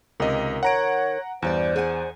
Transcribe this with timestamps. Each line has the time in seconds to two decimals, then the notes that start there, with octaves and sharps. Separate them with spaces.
0.20 C#2 C3 D#3 A#4 D#5
0.63 C#5 F#5 A#5 D7
1.42 E2 G2 G3 C5 D5
1.76 G#4 F#5 G#5